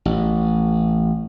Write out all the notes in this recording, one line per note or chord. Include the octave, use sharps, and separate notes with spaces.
A1